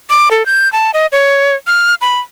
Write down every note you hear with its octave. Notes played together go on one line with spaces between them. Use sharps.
D6
A4
G6
A5
D#5
C#5
F6
B5